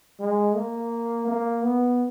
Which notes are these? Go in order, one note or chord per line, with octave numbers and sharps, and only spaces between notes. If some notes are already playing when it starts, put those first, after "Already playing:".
G#3
A#3
A#3
B3